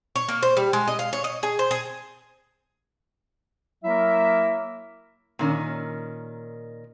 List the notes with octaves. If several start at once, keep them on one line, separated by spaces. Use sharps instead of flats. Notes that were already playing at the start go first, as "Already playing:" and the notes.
C#5
A#3
C5
G3
G#3
D#5
F5
C#5
D#5
G#4
C5
G#4
F#3 A#3 E4 A#4 E5
A#2 D#3 C#4